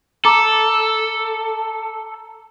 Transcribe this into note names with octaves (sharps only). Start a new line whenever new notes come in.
A4 A#5 D6